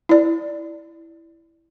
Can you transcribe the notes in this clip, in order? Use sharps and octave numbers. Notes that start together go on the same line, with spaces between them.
E4 D5